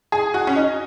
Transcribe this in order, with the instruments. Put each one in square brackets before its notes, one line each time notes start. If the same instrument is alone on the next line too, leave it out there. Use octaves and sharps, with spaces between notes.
[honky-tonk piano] G#4
F#4
C#4
D#4